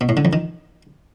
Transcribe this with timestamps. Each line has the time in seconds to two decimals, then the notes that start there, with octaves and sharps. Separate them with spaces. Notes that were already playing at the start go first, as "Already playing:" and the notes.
0.01 B2
0.09 A2
0.17 D3
0.25 F2
0.33 D#3